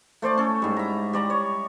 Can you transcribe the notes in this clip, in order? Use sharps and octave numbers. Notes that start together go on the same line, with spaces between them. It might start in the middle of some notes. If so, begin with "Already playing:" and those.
A3 C5 D5 A5
C#4 A4
G#2 G3
E5 A#5
G3 D5 A#5
C#5